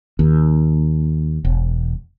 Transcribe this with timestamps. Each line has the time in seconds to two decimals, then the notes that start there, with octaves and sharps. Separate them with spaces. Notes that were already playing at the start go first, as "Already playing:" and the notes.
0.19 D#2
1.45 E1